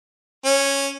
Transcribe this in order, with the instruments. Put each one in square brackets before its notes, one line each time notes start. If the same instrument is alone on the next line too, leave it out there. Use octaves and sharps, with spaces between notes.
[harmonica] C#4